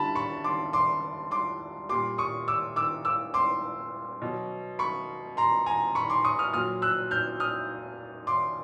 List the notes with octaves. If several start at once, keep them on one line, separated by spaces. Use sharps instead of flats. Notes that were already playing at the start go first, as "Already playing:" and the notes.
Already playing: D3 G3 A5 B5
B5 C#6
C6 D6
C6 D6
C6 D6
A#2 G3 C6 D6
C#6 D#6
D6 E6
D6 E6
D6 E6
C6 D6
B2 F#3
B5 C#6
A#5 C6
G#5 A#5
B5 C#6
C6 D6
C#6 D#6
D#6 F6
A#2 F#3 D#6 F6
E6 F#6
F6 G6
D#6 F6
C6 D6